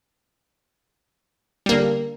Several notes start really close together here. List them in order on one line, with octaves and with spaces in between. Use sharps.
G3 A#3 D3